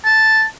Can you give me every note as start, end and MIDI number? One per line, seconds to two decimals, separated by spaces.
0.05 0.44 81